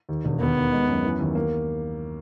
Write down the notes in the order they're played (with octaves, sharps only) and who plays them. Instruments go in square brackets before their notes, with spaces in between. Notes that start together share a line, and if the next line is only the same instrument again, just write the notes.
[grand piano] D#2
E1
[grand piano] D#2 [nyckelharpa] B3
[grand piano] D#2
G#3
F#2
E3
D#2
A#3